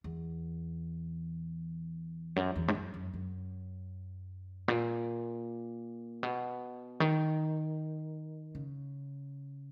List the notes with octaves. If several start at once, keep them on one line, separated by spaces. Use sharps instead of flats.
E2
F#2
E2
G#2
F#2
F#2
F#2
A#2
B2
D#3
C#3